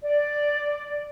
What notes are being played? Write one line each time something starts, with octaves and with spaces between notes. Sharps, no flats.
D5